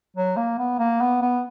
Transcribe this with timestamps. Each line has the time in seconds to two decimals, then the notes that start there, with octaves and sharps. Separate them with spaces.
0.17 F#3
0.37 A#3
0.58 B3
0.79 A#3
1.01 B3
1.22 B3